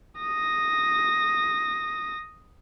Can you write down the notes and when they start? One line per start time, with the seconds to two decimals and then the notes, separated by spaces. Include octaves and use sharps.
0.19 D#6 A#6